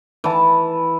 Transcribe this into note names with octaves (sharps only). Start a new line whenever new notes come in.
E3 A5